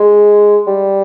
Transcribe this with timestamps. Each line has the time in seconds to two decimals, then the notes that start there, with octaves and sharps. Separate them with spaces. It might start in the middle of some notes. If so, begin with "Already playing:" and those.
Already playing: G#3
0.67 G3